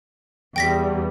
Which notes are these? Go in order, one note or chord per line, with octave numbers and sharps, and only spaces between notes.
E2 G3 G5 A#6 B6